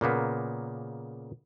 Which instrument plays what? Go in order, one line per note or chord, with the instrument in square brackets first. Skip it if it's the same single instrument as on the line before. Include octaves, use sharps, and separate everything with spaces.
[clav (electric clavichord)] A#2 C#3 A#3 B3